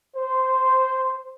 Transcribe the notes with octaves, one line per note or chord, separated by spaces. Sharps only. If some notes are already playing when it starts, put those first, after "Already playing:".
C5